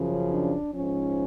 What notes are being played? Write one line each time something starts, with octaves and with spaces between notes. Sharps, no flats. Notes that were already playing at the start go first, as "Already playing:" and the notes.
Already playing: F#2 C#3 F3
D4
G#2 F3 C#4